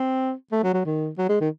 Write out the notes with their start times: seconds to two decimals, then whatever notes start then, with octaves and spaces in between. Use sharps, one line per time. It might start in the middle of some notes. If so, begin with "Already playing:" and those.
Already playing: C4
0.52 A3
0.63 F#3
0.74 F#3
0.86 D#3
1.18 F#3
1.29 G#3
1.41 D#3